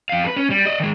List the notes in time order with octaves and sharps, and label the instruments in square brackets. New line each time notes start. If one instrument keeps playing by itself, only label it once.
[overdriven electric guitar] F2 F5
A4 B4
C#4
G3
D5 D#5
D#3 G#3